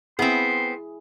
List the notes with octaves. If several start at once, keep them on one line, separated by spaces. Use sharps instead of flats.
B3 C4 E4 G#4 C6